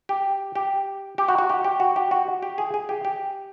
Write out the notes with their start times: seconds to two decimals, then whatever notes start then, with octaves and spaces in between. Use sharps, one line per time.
0.09 G4
0.56 G4
1.18 G4
1.28 F#4
1.39 F#4
1.50 G4
1.64 G4
1.80 F#4
1.96 G4
2.11 F#4
2.43 G4
2.58 G#4
2.74 G#4
2.89 G4
3.05 G4